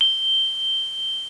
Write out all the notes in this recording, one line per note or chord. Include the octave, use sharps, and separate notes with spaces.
G7